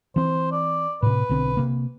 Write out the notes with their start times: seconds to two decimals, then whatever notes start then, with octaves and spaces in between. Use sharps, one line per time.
0.16 E3 C4 C5
0.52 D5
1.02 A2 C3 B4
1.29 B1 D3 C4
1.57 C3 A#3